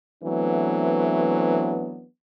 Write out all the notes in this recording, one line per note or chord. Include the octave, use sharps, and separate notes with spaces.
E3 F#3 A3 B3 C4 D4